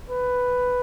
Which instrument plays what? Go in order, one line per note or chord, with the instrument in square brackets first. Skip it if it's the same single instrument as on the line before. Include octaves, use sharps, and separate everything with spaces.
[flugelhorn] B4